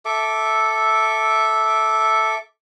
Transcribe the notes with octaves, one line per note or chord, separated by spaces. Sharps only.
A4 E5 D6